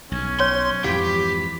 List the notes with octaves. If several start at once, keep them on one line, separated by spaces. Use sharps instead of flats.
B1 C#4
C#5 C6
F2 G#2 E3 G4 F5 B5